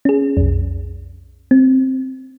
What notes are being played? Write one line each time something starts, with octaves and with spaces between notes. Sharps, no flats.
C#4 G#4
B1 F2
C4